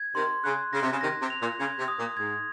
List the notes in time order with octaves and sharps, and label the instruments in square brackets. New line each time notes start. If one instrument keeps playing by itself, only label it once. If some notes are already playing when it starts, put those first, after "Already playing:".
Already playing: [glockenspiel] G#6
[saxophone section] C3 D#3 [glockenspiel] C6
[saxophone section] C#3 [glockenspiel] F#6
[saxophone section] C#3 [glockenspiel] A#6
[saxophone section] C3
C#3
[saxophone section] C3 D#3 [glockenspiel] A#6
[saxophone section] C3
[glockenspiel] F7
[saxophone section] A#2
[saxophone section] C#3 [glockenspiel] G#6
[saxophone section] C3
[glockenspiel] D#6
[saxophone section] A#2
[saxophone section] G#2 [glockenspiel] G#6